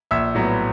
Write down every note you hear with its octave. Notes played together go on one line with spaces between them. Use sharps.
A#1 E5 E6
A2 F#3 B3